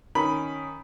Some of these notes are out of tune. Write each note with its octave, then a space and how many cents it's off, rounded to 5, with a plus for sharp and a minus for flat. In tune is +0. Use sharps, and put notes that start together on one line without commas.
D#3 +0 C#4 +0 B5 +5